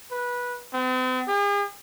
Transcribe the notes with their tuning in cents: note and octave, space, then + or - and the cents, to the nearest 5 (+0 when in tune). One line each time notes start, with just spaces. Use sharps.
B4 -15
C4 -45
G#4 -45